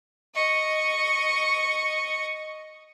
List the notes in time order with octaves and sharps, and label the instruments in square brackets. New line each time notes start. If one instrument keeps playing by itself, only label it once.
[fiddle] D#5 C#6